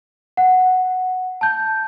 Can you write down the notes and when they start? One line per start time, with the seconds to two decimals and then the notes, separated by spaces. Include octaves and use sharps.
0.37 F#5
1.41 A5 G6